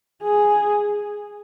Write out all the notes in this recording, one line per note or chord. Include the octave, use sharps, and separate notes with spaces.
G#4